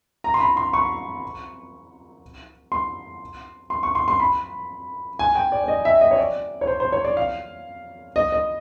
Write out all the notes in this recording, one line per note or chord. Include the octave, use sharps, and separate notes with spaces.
A#5
C6
B5
C6
C#6
C6
C6
C#6
C6
C6
B5
G#5
G5
D5
D5
D#5
E5
D#5
C#5
D5
C#5
C5
C5
C#5
D5
F5
D#5
D#5